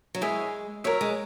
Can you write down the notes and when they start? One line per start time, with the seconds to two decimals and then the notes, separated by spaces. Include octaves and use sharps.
0.15 F#3
0.21 G#3 E4 G#4 C#5 E5
0.84 F#3 A#4 C#5 E5
1.01 G#3